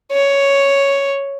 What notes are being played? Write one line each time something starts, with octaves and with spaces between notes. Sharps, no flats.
C#5